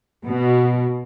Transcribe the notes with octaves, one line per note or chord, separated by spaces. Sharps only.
B2